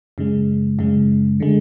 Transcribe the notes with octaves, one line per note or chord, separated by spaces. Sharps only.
F#2 C#3 G#3
F#2 C#3 G#3
D3 G#3